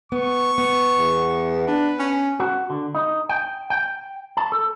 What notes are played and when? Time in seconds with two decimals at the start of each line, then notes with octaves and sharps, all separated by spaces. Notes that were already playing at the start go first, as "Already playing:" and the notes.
0.12 B3 C#6
0.58 B3
0.97 E2
1.67 D4 B4
1.99 C#4
2.40 F#4
2.70 D3
2.95 D#4
3.29 G5
3.70 G5
4.37 A5
4.52 A4